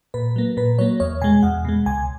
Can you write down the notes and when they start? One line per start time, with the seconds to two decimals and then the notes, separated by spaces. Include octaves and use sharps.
0.14 A#2 B4
0.36 F#3 A#3
0.57 A#2 B4
0.78 F#3 A#3 C#5
1.00 E2 C#5
1.22 B2 G#3 G#5
1.43 E2 F#5
1.65 B2 G#3
1.86 C#2 G#5